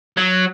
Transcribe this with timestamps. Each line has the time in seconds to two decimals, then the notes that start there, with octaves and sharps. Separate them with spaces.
0.17 F#3